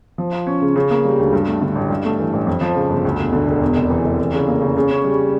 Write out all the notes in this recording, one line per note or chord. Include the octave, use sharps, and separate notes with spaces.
F3
F4
C#4
C#3
C#3
A#3
G3
D2
G2
A3
D3
A1
G2
A3
E3
A1
F2
F3
C#3
G1
D2
E1
D3
E1
E2
F1
E3
F1
E3
C#3
A#3
C#3
C#3
C#4
G3